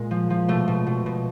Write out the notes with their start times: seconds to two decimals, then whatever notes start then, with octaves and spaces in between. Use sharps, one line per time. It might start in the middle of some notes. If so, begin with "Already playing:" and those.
Already playing: A#2 G#3
0.11 F3
0.30 F3
0.48 B2 A3
0.68 B2
0.87 B2
1.06 B2